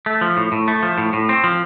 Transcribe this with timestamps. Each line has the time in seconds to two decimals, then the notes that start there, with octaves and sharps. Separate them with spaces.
0.06 A3
0.21 F3
0.37 A2
0.52 A2
0.68 A3
0.83 F3
0.98 A2
1.13 A2
1.29 C4
1.44 F3